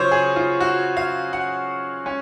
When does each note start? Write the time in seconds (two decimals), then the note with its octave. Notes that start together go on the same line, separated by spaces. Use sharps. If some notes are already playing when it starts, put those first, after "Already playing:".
Already playing: C#3 F#3 C#4 F4 C5 C#5
0.11 G#4
0.36 F4
0.60 F#4
0.97 F5
1.33 F#5
2.06 C#4